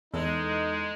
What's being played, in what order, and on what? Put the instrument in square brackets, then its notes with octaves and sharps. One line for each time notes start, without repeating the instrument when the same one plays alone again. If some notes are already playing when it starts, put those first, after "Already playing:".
[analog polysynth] E2 [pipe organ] G#3 [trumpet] D#4 [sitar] A4